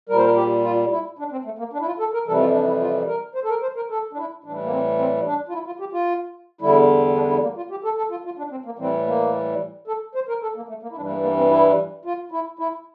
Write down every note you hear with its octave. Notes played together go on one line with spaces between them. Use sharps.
A#2 G3 A#4
C5
A#4
G4
F4
E4
D4
C4
A3
A#3
D4
E4
F4
A4
A#4
F2 C3 E3 G3 A4
F4
D4
E4
F4
A#4
C5
A4
A#4
C5
A#4
A4
D4
E4
A2 E3 G3 D4
A#3
C4
C4
D4
F4
E4
F4
G4
F4
E2 D3 G3 E4
D4
E4
A#3
F4
G4
A4
A4
F4
F4
D4
C4
A#3
A2 E3 G3 C4
A#3
A4
C5
A#4
A4
A#3
A3
A#3
E4
G2 E3 G3 D4
A#3
A#3
C4
E4
F4
E4
E4